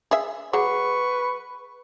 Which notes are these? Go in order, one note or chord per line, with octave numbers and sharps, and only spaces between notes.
G#4 E5
F#3 G#4 B4 F#5 C#6